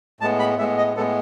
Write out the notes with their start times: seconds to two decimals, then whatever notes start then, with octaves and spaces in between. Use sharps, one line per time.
0.20 A2 G#3 B3 A5
0.39 B5
0.58 A2 G#3 B3 E5
0.78 D#5
0.96 A2 G#3 B3 A4